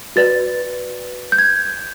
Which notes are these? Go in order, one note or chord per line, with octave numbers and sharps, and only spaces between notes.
F#4 B4 D5 A6
G6
G#6